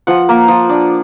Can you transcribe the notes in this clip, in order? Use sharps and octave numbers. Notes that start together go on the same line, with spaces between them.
F3 F#5
A#3
F3
D4